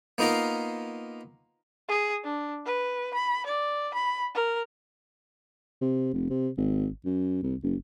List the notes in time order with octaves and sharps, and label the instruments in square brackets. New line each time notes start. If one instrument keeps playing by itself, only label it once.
[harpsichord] A#3 B3 D#4 F4 A#4 F5
[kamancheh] G#4
D4
B4
B5
D5
B5
A#4
[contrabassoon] C3
F1
C3
G#1
F#2
C2
F#1